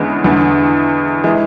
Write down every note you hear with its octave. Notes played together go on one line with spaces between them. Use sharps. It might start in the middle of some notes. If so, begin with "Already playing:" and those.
Already playing: E2 D3 G#3 B3 C#4
E2 D3
E3 G#3